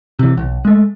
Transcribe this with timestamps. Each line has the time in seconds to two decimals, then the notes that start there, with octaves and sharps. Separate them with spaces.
0.19 C3 E3
0.37 B1
0.65 G#3 A3